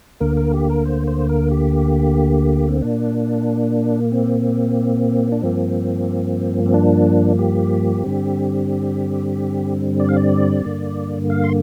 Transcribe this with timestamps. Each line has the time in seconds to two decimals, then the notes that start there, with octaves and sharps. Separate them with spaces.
0.20 D2 D3 A#3 A#4
0.37 A#4
0.54 G4
0.69 A#4
0.86 C5
1.07 C5
1.29 A#4
1.51 G4
2.69 C4
2.81 A#2 A#3 D4
4.12 C4
5.32 D4
5.42 G2 F3 A#3 C4
6.66 C4
6.74 D4
7.39 G4
8.04 G2 D3 G3 C4
10.00 D5
10.09 F5
10.16 D5
10.65 G2 D3 A#3
11.30 F5
11.44 C6